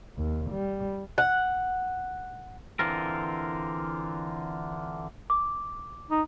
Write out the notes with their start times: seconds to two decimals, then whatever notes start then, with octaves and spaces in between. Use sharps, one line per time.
0.17 D#2
0.51 G3
1.18 F#5
2.79 D3 E3 C4 F4 A#4
5.30 D6
6.11 D#4